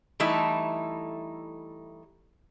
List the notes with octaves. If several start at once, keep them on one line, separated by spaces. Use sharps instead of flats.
E3 G3 A3 D#4 E4 A4